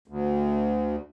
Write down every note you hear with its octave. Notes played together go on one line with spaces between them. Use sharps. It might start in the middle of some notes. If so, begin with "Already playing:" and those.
D2